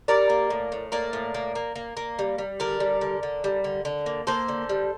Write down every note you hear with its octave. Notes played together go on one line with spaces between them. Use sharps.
G3 A#4 D5
A#3
A2
A2
A#3 A#4 D5
A2
A#3
A#3
A#3
A#3
G3
G3
D3 A#4 D5
G3
D3
D3
G3
D3
D3
A#3
A#3 A4 C5
D3
G3